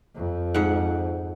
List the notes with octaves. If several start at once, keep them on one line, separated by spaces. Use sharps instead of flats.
F2
G#2 F#5